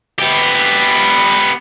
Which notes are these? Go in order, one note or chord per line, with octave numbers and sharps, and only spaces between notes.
B3 G4